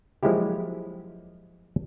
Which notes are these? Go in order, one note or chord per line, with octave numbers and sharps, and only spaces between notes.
F3 F#3 G#3 A#3 E4 G4